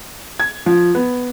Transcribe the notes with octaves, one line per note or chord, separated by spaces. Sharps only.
G#6
F3
B3